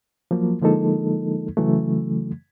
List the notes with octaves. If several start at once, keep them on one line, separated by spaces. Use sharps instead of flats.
F3 F#3 A#3
D3 F3 G#3 A#3 D#4 A4
C#3 E3 F#3 A3